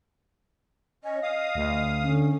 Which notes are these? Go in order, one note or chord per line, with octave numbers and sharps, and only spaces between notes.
C#4 D#5
F5 D#6
D2
D3 C#4